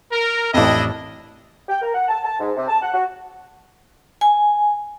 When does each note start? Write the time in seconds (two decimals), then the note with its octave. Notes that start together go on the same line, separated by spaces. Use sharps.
0.12 A#4
0.54 A1 F2 D4 E4 D#5
1.69 G5
1.82 A#4
1.94 F#5
2.08 A5
2.23 A5
2.40 G#2
2.57 C3
2.68 A5
2.82 F#5
2.94 F#4
4.21 G#5